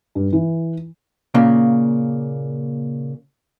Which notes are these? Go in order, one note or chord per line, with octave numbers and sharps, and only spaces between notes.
G2
E3
A#2 C#3 A#3